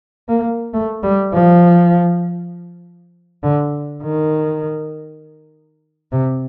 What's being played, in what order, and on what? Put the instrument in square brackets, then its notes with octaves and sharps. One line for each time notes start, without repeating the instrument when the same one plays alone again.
[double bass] A#3
A3
G3
F3
D3
D#3
C3